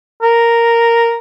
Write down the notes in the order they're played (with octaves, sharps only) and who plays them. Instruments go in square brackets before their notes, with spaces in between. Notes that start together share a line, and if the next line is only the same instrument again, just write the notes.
[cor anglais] A#4